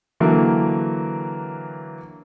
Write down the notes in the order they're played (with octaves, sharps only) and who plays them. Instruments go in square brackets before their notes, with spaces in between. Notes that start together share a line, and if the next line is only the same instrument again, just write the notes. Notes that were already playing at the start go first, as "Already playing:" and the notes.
[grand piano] D3 E3 F#3 A#3